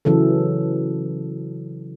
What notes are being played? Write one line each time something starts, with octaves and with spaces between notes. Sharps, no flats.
C#3 E3 F#3 A4